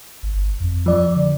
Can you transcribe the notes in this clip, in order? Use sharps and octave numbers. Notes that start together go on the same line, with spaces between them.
G1
F2
F3 D5
D3